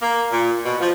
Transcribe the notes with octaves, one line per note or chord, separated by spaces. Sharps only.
A#3
A#2
B2
F3